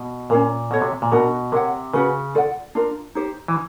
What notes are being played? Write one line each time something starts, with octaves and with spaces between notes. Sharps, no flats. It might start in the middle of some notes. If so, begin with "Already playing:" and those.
Already playing: B2
A#2 C#4 F4 A#4
B2 F#4 A4 C#5
C3
A#2
B2 D4 F#4 A#4
C3 A#4 C#5 F#5
C#3 C#4 F#4 B4
F4 A4 D5 F#5
D4 F4 A#4
D#4 G4 C5
E3